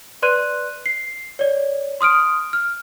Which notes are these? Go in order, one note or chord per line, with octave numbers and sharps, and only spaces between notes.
B4 D5 C6 F#6 D#7
C7
C#5 D5
C6 D#6 F6 D7
F6